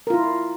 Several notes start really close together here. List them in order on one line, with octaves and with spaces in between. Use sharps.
A#4 F4 E4